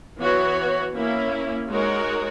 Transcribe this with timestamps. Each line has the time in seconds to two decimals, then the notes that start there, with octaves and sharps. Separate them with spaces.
0.19 E3 B3 F#4 C#5
0.94 A#3 C#4 E4
1.69 G#3 D#4 F#4 A#4 C#5